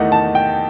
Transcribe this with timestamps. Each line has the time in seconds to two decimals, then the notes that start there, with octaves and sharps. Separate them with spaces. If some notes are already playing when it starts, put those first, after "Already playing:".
Already playing: E2 D#3 A3 D#4 F#5
0.12 A5
0.35 G5